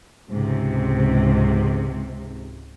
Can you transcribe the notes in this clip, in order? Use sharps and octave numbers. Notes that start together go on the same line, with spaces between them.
C#2 G#2 C3